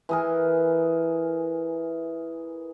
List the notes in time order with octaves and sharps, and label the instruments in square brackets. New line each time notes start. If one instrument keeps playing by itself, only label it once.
[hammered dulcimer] E3 G#4 A#4